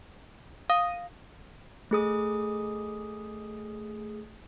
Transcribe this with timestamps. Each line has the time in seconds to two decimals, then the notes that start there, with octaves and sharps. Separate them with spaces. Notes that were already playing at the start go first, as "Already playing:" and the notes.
0.70 F5 D#6
1.91 A3 G#4 D#6